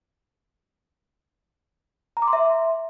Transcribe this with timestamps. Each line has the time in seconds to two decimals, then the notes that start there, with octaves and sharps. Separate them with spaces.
2.17 A#5
2.22 D6
2.28 C6
2.33 E5